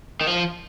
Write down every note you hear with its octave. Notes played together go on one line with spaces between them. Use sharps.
D#3
F3